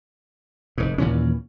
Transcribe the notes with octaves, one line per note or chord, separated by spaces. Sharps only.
F1 G#2
D#2 A#2 E3 C#4